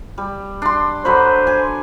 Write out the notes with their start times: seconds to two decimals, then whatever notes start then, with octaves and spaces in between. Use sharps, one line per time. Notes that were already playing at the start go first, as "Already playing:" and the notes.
0.18 G3
0.62 D4 C6
1.05 D3 F#3 B4 C5
1.47 G#5